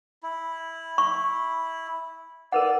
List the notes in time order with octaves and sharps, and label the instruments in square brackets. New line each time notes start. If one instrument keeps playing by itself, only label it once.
[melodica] E4
[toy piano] C#6
[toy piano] A#4 B4 F#5 [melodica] D5